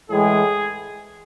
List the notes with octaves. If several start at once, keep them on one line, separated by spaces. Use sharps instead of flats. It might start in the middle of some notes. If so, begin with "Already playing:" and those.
A2 E3 G#3 G#4